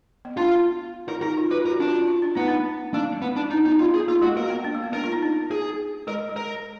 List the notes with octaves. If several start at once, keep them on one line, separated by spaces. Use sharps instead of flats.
B3
D4 F4
A#4
D#4 A#4
F4
F#4 B4
F4
A#4
F#4
D4 F4
F4
F4
D4
B3 D#4
D4
A#3 D4
B3
D4
D4 D#4
B3 D#4
B3 F4
G#4
A#3 F4
G#3 F#4
A#3 A#4
B3
D4
A#3
B3
D4 A#4
F4
D#4
D4
G#4
G#3 A#4
G#3
A#4